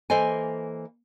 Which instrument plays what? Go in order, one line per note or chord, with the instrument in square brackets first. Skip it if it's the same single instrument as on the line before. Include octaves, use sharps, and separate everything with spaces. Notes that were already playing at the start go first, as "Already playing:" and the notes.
[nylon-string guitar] E3 A#3 A4 C5 D#5 G#5